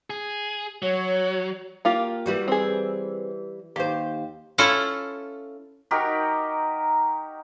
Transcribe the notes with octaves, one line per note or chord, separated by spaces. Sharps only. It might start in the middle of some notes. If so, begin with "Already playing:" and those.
G#4
F#3 C#5
A#3 F4 G4
E3 G3 F#4
C4 G#4
D#2 G4 C5
C#4 E4 F4 A4
D#4 F#4 G4 A#4